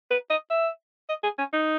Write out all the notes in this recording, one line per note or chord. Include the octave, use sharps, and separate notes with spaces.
B4
D#5
E5
D#5
G#4
C#4
D#4